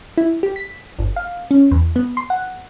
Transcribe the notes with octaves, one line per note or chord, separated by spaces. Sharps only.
E4
G4
B6
G1
F5
C#4
E2
B3
C6
F#5